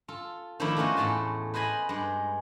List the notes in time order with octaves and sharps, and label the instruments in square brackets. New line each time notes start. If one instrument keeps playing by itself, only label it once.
[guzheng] F4 A4
D#3 F3 A3 A#3 D4 E4
A3 B3 C#4 D#4 F4 F#4
E2 A2 A3 A5 C6
B4 C5 D#5 G#5 B5
G2 G#3